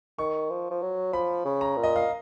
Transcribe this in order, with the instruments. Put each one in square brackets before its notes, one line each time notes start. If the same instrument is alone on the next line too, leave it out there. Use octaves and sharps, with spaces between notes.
[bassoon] D#3 [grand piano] C#6
[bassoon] F3
F3
F#3
[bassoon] F3 [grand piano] B5
[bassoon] C#3
[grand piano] A#5
[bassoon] A#2
[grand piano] D#5
F5